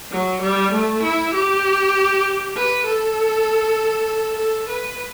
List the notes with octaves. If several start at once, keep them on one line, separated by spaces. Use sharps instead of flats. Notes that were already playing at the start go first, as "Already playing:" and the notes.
F#3
G3
A3
E4
G4
B4
A4
A4
B4